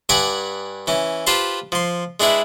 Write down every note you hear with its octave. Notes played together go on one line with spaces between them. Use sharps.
G2 F#5 G#5 A#5 B5 D6
E3 C#4
F4 G4 B4 C5 A5 C6
F3 C6
G#3 D4 E4 B4